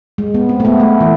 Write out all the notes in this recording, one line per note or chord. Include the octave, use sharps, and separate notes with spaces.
G#3
B3
C4
A3
B3
A3
E3